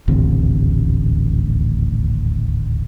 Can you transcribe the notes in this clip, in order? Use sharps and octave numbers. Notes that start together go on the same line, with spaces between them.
D#1 A1 D2 C3